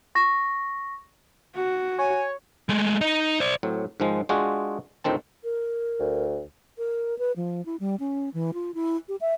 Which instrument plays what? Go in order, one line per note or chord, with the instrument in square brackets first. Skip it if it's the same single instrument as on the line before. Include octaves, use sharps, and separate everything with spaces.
[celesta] C#6 A#6
[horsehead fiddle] F#4
[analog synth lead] C#5 [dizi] G#5
[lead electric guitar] G#3 A3
D#4 D#5
C5 D5
[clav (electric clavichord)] A2 F#3 C4
G#2 D#3 F3 G#3
G#3 D4 F4 F#4 G#4
D2 A2 D#3 C4 A5
[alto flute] A#4
[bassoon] D2
[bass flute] A#4
B4
F3
E4
G3
C#4
E3
F4
E4
G4
E5